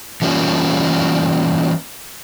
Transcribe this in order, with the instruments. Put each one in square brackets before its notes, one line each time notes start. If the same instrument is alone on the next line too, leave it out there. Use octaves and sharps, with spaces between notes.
[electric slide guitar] E3 G3 A#3 C#4 F4